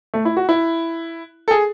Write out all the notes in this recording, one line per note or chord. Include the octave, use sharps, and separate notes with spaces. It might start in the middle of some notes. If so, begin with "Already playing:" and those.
A3
E4
F#4
E4
A4
G#4